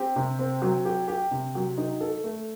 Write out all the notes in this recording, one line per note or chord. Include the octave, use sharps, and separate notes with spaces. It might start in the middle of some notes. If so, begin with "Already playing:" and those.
Already playing: C4 G4
C3
C4
F#3
G4
G4
C3
F#3
D#4
A4
A3